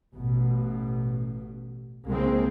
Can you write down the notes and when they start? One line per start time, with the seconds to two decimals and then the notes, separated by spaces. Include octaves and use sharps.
0.14 A1 B2
2.08 C2 A#2 C#3 G#3 A#3 C4